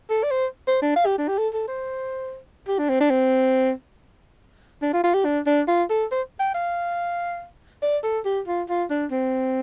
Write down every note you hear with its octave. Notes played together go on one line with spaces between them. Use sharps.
A4
D5
C5
C5
D4
F5
G4
D4
G4
A4
A4
C5
G4
D4
C4
D4
C4
D4
F4
F4
G4
D4
D4
F4
A4
C5
G5
F5
D5
A4
G4
F4
F4
D4
C4